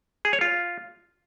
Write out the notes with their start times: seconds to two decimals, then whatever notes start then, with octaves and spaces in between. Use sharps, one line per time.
0.25 G#4
0.33 C#5
0.41 F4